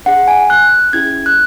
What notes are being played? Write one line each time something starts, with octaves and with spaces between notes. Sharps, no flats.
D4 G#4 F#5
G#5
F#6
C#4 E4 G#4 G#6
F#6